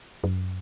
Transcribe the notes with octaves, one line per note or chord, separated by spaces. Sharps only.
F#2